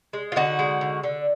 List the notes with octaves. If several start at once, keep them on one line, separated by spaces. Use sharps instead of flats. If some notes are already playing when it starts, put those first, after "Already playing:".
G#3
F4
D3 D#4 F#4
G#3
D3
D3